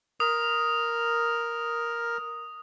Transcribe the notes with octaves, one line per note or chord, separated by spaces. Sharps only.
A#4 D#6